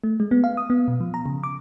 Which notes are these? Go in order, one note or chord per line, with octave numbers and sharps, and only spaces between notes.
A3
G#3
B3
F5
D#6
B3
B2
F3
A#5
C#3
D6